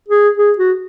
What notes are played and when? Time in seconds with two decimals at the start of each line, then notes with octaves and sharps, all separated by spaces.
0.09 G#4
0.38 G#4
0.58 F#4